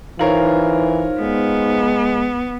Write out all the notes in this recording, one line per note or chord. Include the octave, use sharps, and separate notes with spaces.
E3 D#4 F4 A#4 C5 C#5
G#3 B3